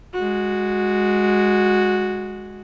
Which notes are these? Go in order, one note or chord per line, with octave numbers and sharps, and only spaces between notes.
G#3 F#4